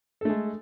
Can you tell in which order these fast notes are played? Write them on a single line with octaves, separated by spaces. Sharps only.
A4 A3 G#3